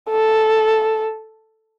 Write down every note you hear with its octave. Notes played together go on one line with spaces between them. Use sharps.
A4